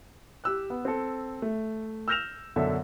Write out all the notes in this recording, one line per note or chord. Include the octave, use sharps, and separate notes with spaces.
G4 E6 F#6
B3
C4 A4
A3
E6 F6 G6 A#6 E7 F7
F#2 B2 D3 A4 E5